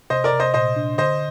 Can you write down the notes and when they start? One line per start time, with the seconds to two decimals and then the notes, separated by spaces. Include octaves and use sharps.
0.10 C3 C5 D#5
0.24 A#4 D5
0.32 C3
0.40 C5 D#5
0.54 A#2 C5 D#5
0.76 D4
0.98 D3 C5 D#5